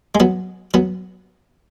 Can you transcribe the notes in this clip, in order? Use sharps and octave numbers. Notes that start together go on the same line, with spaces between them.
G#3
F#3 B3
F#3 B3